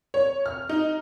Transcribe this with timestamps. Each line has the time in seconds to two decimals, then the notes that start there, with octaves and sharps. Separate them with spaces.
0.14 C#5
0.46 F6
0.69 D#4